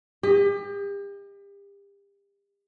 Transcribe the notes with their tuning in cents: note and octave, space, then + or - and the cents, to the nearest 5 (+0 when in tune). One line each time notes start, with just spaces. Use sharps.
G4 +35 D#5 +0